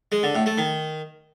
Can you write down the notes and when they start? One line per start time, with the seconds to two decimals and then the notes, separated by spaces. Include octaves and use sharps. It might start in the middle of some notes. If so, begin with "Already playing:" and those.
0.12 G#3
0.23 D3
0.35 A2
0.46 A3
0.58 D#3